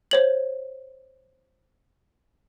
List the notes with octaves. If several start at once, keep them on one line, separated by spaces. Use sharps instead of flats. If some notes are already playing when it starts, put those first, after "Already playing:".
C5 C#5 F#7